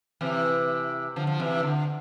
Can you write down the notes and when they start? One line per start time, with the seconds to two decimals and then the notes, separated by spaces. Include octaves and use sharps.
0.21 C3 E3
1.16 D3 F3
1.27 F3
1.40 C3 E3
1.63 D3